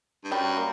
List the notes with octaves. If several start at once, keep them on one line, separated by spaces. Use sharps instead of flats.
G2
F#2 G3
A#3